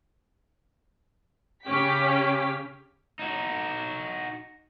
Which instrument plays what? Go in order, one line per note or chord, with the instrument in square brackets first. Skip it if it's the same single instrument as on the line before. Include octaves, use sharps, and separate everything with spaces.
[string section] C#3 C#4 G4 B6
[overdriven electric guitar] D#4 F#4